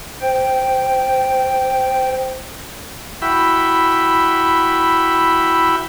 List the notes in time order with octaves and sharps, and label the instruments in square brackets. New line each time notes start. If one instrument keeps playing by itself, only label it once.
[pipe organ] C5 G5
[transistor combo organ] E4 F#4 E5 G5 B5